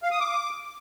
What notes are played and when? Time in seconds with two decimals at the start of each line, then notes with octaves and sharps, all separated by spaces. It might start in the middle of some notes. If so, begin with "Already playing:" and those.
0.03 F5
0.12 D#6
0.20 D6